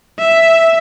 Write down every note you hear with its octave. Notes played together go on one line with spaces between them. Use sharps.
E5